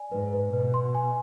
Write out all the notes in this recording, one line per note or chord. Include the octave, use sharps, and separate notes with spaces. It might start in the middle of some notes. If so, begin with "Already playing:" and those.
Already playing: D5 G#5
G#2 B4
B4
B2 B4
C6
G#5